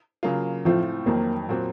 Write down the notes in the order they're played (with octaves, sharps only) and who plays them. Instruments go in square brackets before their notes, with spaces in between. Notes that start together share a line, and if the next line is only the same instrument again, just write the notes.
[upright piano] C#3 F#3 A#3 F4
[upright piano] A2 A3 C4 F4 [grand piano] F3
[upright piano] F2 D#3 F#3 [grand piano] A#3
[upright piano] A#2 F#3 C4 F#4